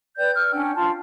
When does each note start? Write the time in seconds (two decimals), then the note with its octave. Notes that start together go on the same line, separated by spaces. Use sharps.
0.18 B4 D5 G5 G6
0.35 E6 F6
0.52 C#4 D4 F#5 G5
0.76 F4 A5